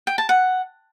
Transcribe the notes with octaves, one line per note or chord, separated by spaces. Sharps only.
G5
A5
F#5